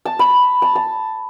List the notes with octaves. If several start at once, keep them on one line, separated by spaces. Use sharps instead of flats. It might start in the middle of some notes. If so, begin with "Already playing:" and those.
A5
B5
A5
A5